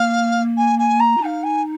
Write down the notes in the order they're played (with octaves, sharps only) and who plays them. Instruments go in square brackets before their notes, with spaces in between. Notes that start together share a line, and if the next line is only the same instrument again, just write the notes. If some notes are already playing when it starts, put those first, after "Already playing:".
Already playing: [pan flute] A#3 [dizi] F5
[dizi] G#5
G#5
A#5
[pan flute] F4
[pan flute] D#4 [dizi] G#5
[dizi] F5
G#5